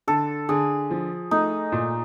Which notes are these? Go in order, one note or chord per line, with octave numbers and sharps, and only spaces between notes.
D3 A4
D3 G#4
F3
A3 D#4
A#2